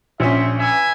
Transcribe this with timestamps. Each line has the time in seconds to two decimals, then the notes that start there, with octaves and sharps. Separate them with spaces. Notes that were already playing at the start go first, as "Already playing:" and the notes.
0.20 A#1 C#4 C5 E5
0.58 B4 E5 G#5